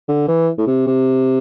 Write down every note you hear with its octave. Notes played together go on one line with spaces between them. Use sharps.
D3
E3
A2
C3
C3